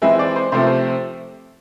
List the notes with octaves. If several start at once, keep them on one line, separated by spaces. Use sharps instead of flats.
E3 G#3 C4 E4 E5
D5
C5
C3 F3 A3 C4 C5
C5